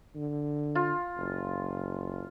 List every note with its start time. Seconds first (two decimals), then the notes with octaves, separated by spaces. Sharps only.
0.16 D3
0.75 F4
1.17 F#1